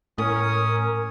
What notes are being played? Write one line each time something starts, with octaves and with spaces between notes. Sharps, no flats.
A2 C#4 A#4 D#6